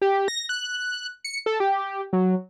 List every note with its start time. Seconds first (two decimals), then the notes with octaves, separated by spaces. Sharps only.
0.02 G4
0.28 A#6
0.49 F#6
1.25 C#7
1.46 A4
1.60 G4
2.13 F#3